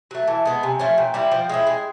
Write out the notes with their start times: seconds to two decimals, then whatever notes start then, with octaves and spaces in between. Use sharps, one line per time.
0.11 F#3 A3
0.28 E3 A5
0.45 G#3 B3
0.63 C3 G#5
0.80 F3 A3 C#4
0.98 A#2 G5
1.14 G3 C4 E4
1.32 F3 G5
1.49 G#3 C#4 E4
1.67 G#3